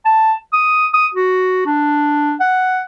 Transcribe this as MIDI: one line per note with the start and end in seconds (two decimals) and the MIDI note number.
0.06 0.34 81
0.53 0.87 87
0.94 1.07 87
1.14 1.65 66
1.66 2.35 62
2.41 2.83 78